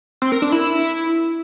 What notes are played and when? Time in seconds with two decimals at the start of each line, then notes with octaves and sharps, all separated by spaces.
0.22 C4
0.32 A#4
0.42 D4
0.52 E4